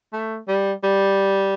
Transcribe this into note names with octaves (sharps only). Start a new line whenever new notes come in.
A3
G3
G3